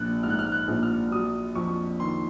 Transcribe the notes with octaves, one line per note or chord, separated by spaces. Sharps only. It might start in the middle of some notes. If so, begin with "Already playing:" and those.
Already playing: A#1 F3 F#6
G#2 F6
F#6
F6
F#6
A#1
F6
F#3 D#6
F2 C#6
D#3 C6